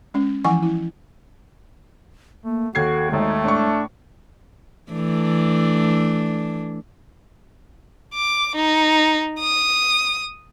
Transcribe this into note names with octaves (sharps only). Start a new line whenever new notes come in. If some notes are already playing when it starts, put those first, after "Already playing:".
G#3 C#4
E3 F3 E4 F#5 G#5 C#6
E4
A3 A#3
D#2 F#4 A4 G#6 C7
G#1 D#2 G#3 A3 D#4
A2 D4 C#6
E3 A3 D4
D6
D#4
D#6